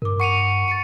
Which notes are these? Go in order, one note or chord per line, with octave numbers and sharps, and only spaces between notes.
G2 A#4 D6
F#5 C#6 C#7 D#7 F7
A6 C#7